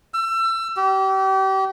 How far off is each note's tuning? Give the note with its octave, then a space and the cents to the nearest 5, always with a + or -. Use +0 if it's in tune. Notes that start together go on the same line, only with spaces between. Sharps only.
E6 +30
G4 -35